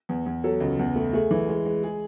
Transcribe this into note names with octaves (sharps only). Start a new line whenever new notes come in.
E2
E2
F#3 A4
C#2
E2
A3
A3 G#4
E3
G#3
G#3
G#4